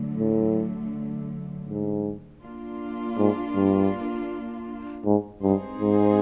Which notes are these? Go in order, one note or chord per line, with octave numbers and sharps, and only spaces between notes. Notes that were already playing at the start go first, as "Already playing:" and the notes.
Already playing: D3 F#3 A3
A2
G#2
A#3 D4 F4
G#2
G2
G#2
G2 G#3 C4 D#4 G#4 C5
G#2